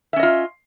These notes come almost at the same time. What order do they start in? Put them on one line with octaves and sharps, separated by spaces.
E5 C#4 D#5 F4